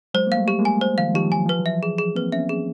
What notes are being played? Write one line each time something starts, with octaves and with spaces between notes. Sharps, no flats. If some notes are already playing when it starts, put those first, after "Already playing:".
F#3 G#3 C5
A#3
F5
G3 A3
G4
G#3 A#3
G#5
C5
D#3 F3 F5
D#3 F3 G4
F#3 G#5
F3 B4
E3 F#3
E5
G#4
G#4
A#3 C4 B4
B3 C#4 E5
G#4